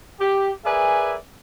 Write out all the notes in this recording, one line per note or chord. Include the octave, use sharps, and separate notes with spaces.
G4
G#4 A#4 B4 D5 E5 G#5